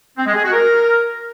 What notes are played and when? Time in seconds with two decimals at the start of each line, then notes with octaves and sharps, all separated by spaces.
0.17 C4
0.26 G#3
0.35 G#4
0.44 F#4
0.53 A#4